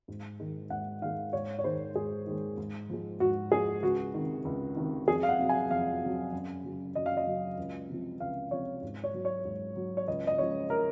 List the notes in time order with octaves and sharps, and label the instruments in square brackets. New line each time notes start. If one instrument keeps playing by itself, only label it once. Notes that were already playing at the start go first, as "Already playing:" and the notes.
[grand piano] G#2
D#3 G#3
G#2 F#5
D#3 G#3 F5
G#2 C#5
C#5
D#3 G#3 C5
G#2 G#4
D#3 G#3
G#2
F3 G#3
G#2 F#4
F3 G#3 G#4
C#2 F#4
C3 D#3
C#2
C3 D#3
F2 G#4
F5
F#5
C3 F#3
G#5
F2 F5
C3 F#3
F#2
C#3 F#3
F#2 D#5
F5
D#5
C#3 F#3
C#2
C3 F3
C#2 F5
C3 F3 C#5
G#2
C#5
F#3
C#5
G#2
F#3
C#5
C#2 D#5
D#5
C#3 F3 G#3 C#5
A#4